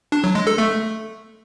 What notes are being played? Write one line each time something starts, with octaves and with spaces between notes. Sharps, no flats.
D4
F#3
G#3
A4
A3